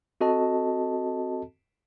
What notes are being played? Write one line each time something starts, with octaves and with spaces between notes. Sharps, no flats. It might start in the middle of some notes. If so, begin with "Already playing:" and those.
C4 F#4 A4 D#5 A5